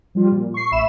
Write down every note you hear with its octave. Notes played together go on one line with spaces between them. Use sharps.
F3 G3 F4
A#2
C#6 C7
A1 E5 B5 E7